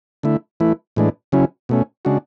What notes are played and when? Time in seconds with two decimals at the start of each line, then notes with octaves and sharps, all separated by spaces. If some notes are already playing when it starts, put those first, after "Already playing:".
0.23 D3 A3 E4
0.60 E3 A3 E4
0.96 A2 E3 G#3 D4
1.32 C#3 F#3 C#4 E4
1.69 B2 A3 C#4
2.05 C#3 G#3 D4 F#4